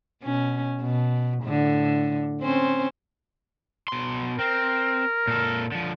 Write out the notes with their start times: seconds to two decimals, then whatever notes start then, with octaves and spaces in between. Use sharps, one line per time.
0.23 B2 C#4
0.81 B2
1.44 A2 D3
2.42 C4 C#4 C5
3.88 B2 C6
4.39 C4 A#4
5.27 A#2 A4
5.72 D3 F3